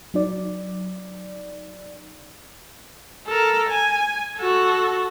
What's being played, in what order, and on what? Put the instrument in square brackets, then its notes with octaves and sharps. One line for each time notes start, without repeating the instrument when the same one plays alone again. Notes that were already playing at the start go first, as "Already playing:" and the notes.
[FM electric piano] F#3 D#4 D5
[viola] A4 A#4
G#5
F#4 A4